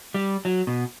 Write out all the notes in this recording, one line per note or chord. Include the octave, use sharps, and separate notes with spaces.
G3
F#3
B2